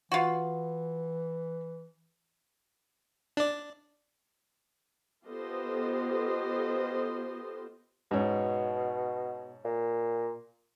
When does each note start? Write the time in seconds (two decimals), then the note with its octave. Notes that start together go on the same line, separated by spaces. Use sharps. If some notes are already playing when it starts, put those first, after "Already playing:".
0.12 E3 F4 F#4
3.37 D4 D5
5.27 B3 F4 G4 A4 C5 D#5
8.11 G#2 B2 C#4
9.65 A#2